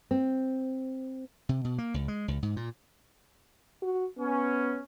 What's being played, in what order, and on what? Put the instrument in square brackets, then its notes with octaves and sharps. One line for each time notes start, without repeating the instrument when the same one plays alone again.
[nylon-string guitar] C4
[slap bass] C3
B2
A#3
C#2
G#3
C#2
G#2
A#2
[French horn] F#4
[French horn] B3 [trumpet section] C#4